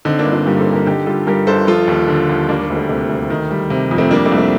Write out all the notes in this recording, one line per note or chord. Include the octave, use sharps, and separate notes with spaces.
D3 C4 D#4
A#3 D4
G1
D4 F4
G2 G4 A#4
A4 C5
G1
G4 A#4
D3 D#4 G4
G3 F4 A4
G2 G4 A#4
G1 A4 C5
F3 F4 A4
D#2
D3
D#2
G3 A#3 D4
A#3
D2
A3
C3 A3
D2
D#3
G3
C3
F2
A3 C4
G3 A#3 D4
A3 C4
C2
A3